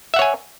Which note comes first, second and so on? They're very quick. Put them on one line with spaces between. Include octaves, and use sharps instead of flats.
E5 F#5 C#5 G#5